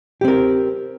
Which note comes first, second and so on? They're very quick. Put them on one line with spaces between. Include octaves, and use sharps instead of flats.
G4 C4 A#4